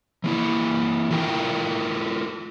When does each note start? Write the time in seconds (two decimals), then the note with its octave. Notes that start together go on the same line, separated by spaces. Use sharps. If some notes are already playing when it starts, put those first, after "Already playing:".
0.24 E3 A#3 E4
1.11 E4 F4 A#4 G5